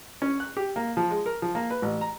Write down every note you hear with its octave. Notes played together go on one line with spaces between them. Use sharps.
C#4
F#6
G4
A#3
F3
G#3
A#4
F3
A#3
B4
A1
A#5